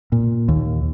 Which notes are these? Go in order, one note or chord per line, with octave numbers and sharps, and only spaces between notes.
A#2
D#2